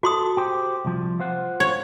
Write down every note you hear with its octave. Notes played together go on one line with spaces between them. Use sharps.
F#4 A4 C6 D#6
G4 C5
C2 F3
F4 C5 F#5
C#5